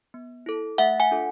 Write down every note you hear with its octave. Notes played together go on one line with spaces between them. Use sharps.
B3
E4 A4
A3 E5 F#5
F#5 G#5
D4 F4 A4